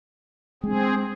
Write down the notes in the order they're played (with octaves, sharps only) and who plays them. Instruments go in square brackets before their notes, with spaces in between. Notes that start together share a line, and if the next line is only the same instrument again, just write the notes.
[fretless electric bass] G#3 D4 [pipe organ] C4 G#4